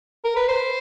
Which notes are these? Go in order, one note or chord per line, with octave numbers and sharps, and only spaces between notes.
A#4
B4
C5